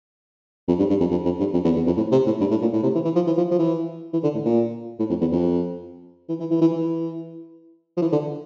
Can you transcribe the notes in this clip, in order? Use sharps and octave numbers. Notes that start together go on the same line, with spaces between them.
F2
G2
G2
F2
F2
F2
G2
F2
E2
E2
F2
A2
C3
A2
G2
A2
A#2
A2
C3
E3
E3
F3
E3
F3
F3
E3
E3
D3
A2
A#2
A2
F2
E2
F2
E3
E3
E3
E3
E3
F3
E3
D3